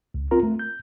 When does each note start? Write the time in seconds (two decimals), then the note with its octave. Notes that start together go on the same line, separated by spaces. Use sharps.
0.14 C#2
0.31 C4 F4 A#4 A#5
0.43 A3
0.59 G6